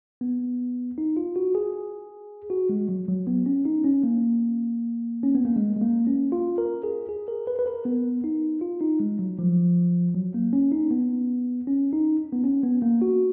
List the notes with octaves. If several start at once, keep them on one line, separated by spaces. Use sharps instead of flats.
B3
D#4
F4
F#4
G#4
F#4
G#3
F#3
F#3
B3
C#4
D#4
C#4
A#3
C#4
B3
A#3
G#3
G#3
A#3
C#4
F4
A#4
G#4
G#4
A#4
B4
B4
A#4
B3
D#4
F4
D#4
G#3
F#3
F3
F#3
A#3
C#4
D#4
B3
C#4
D#4
B3
C#4
B3
A#3
F#4